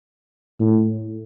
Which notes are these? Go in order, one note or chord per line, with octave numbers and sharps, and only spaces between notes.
A2